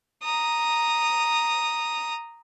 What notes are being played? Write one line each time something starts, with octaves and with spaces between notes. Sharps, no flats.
A#5 D#6